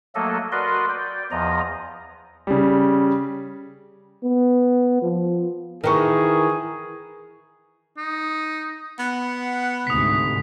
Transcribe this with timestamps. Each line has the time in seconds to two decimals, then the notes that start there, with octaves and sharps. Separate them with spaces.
0.15 F#3 A3 A#3 A4 D#5
0.52 F#4 A#4 B4 D5 D#5 C6
0.89 D5 G5
1.31 E2 F3 D#5 A#5
2.47 C#3 G3
4.24 B3
5.02 F3
5.84 D#3 E3 G#4 A#4 C#6
7.98 D#4
8.99 B3 F#5
9.87 D2 G#2 C3 D#6 B6